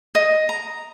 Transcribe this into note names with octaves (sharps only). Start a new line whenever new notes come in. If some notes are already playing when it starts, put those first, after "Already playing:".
D#5
A#5